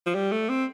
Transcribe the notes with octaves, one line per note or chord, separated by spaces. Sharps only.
F3
G3
A3
C4